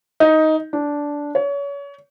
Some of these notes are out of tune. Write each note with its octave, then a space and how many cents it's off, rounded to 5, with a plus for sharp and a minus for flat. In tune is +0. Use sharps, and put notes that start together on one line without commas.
D#4 +10
D4 -10
C#5 +30